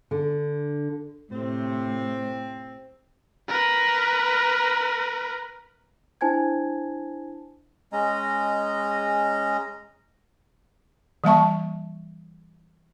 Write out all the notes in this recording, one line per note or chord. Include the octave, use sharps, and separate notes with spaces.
D3
A2 C3 C4
A#4 B4
D4 E4 C5 G#5 A5 G#6
G#3 C#4 D#5 A#5
E3 G3 A#3 E5 A5 C#6